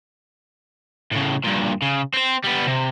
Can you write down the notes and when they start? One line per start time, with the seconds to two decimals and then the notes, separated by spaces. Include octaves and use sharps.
1.12 A2 C#3
1.44 G2 A#2
1.82 C#3
2.13 C4 C5
2.44 G3 B3
2.67 C3